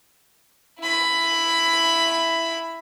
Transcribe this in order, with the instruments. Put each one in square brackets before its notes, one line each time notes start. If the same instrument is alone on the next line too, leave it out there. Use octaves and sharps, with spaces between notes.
[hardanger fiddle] E4 B5